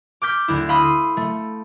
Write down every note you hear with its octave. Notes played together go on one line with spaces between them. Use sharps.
D6 F6 G6 B6
D2 E4
F5 B5 C6 D#6 E6
A3